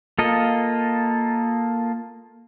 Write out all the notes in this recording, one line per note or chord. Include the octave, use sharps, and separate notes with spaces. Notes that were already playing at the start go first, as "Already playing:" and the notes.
A#3 F4 A4 D#5